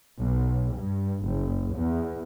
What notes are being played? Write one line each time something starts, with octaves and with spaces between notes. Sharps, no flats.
B1
G2
F#1
E2